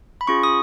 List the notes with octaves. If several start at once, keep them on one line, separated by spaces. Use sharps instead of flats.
B5
C#4 F4 G#4 C#6
D#6